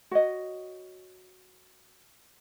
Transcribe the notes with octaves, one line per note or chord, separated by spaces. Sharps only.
F#4 C#5 D#5